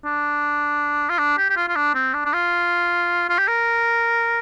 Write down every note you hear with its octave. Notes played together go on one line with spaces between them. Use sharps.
D4
F4
D4
G4
G4
F4
F4
D4
C4
D4
D4
F4
F4
G4
A#4